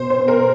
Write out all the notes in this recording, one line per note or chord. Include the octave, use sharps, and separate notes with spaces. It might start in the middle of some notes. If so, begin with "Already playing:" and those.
Already playing: B2 C5
C5
B2
A#4